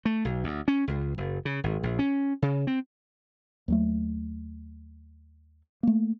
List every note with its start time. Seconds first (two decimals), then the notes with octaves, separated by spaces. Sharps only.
0.05 A3
0.25 B1
0.44 D2
0.68 C#4
0.88 C#2
1.18 F#1
1.45 C#3
1.64 G#1
1.83 A#1
1.99 C#4
2.42 C#3
2.67 C4
3.68 D#2 F#3 A3
5.83 A3 A#3